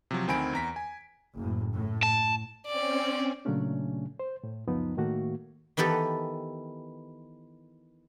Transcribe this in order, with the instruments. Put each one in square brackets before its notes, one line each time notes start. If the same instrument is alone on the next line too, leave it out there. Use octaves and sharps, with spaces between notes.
[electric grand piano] C3 F3 F#3
D2 D#3 C4 G#5 B5 D7
E2 A#5 B6
G#5
[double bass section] F#1 A2
A2
[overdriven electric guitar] A5
[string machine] C4 C#4 [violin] D5
[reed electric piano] A#2 C#3 F#3 A3 C#4 D4
C5
A2
C#2 F#2 F3 B3 D#4
A2 D#3 A3 A#3 F#4
[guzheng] D#3 E3 B3 G4 A4